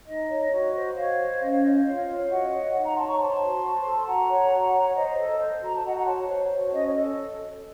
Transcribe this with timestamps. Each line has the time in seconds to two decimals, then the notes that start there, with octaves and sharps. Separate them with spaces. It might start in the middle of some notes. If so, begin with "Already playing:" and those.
0.07 D#4 D#5
0.29 C#5
0.52 F#4 D#5
0.74 C5
0.96 F#4 C#5 F5
1.18 C5
1.40 C#4 D#5
1.51 C#5 F5
1.62 C5 D#5
1.73 D#5
1.84 F4 C#5 F5
2.07 C#5
2.29 F#4 D#5 F#5
2.51 C#5
2.73 D#4
2.84 F#5 A#5
2.95 C#5 A5 C6
3.06 A#5 C#6
3.17 C5 A5 C6
3.40 F#4
3.62 C5
3.84 A4
4.06 F#4 F#5 A#5
4.28 C#5
4.51 F#4
4.73 C#5
4.95 C5 D#5
5.17 A4
5.40 C5
5.62 F#4 A#5
5.74 A5
5.83 F#4 D#5 F#5
5.94 F#5 A#5
6.05 C#5 A5 C6
6.17 C#5
6.28 C5
6.50 F#4
6.72 C#4 D#5
6.83 C#5
6.94 A4 D#5